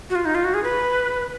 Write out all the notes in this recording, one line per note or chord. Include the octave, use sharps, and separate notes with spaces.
F#4
F4
D#4
F4
F#4
G#4
B4